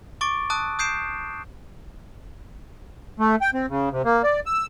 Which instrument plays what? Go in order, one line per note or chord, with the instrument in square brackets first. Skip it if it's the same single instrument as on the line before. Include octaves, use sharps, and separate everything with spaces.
[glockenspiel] C#6 D6 A6 D7
A5 D#6 F#6 D7
D#6 G6 C7 D7 E7
[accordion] A3
G5
C4
C#3
C3
A#3
D5
E6